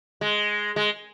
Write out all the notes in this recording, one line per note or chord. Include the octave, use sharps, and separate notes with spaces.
G#3
G#3